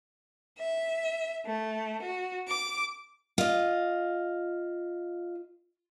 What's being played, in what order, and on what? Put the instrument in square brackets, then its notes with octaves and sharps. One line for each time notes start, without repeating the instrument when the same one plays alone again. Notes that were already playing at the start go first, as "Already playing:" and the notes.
[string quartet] E5
A3
F#4
D6
[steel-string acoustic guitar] F4 D#5